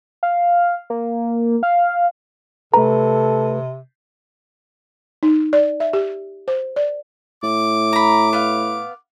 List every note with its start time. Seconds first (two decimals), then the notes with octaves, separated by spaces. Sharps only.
0.23 F5
0.90 A#3
1.63 F5
2.74 C3 A3 A4 B4 A#5
5.23 D#4
5.53 D5
5.80 E5
5.93 G4
6.48 C5
6.76 D5
7.43 A2 D6
7.93 A#5 B5
8.33 B3 F5